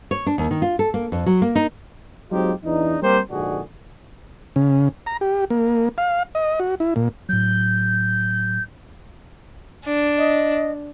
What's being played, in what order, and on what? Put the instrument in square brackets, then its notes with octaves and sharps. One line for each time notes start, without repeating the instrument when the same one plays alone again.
[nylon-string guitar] C#5
D4
D#2
D#3
F4
A4
A#3
F2
F#3
A#3
D#4
[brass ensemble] F#3 G#3 C4 D#4 F4 G4
E2 E3 D4 D#4
G3 A#3 C4 G4 A#4 C5
A#1 G#2 D3 D4 F#4 G#4
[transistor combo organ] C#3
A#5
G4
A#3
F5
D#5
F#4
E4
A#2
[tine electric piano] A2 F#3 [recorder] G6
[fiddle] D4
[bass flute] D#5